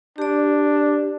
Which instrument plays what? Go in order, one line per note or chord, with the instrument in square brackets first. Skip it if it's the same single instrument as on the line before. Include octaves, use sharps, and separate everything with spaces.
[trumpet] D4 [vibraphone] G4 D5